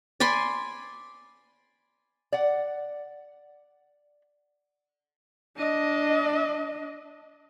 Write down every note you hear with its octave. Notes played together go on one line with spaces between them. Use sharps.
D5 G#5 B5 C6
D5 F#5
D4 D#5